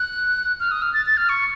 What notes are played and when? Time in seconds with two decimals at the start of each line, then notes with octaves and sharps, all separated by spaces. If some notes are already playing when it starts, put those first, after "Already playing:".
Already playing: F#6
0.60 F6
0.71 D#6
0.82 F6
0.94 A6
1.06 A6
1.17 F6
1.29 C#6